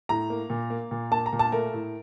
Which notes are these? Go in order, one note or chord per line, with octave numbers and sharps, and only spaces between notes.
A2 A#5
A#3
A#2
A#3
A#2
A#3 A5
A#5
A#2
A5
A3 A#4
A2